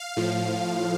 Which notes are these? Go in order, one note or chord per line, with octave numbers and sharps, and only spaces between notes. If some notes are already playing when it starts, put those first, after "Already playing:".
Already playing: F5
A2 F3